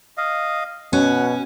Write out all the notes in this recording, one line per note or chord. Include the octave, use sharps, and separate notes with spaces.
D#5 F5
B2 C#4 F#5